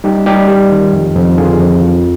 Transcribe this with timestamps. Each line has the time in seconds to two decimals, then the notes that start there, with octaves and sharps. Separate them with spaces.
0.04 G3 D#4 G4
0.26 G3 D#4 G4
0.48 G3
0.71 D#3
0.93 F2
1.16 F2
1.38 D3 F4 G#4
1.60 F2
1.82 F3